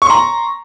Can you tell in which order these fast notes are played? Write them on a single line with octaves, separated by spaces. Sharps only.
C#6 C6 A#5